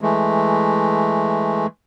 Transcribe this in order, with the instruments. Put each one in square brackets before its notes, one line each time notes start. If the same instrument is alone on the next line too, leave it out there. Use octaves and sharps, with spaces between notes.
[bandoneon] E3 G#3 A3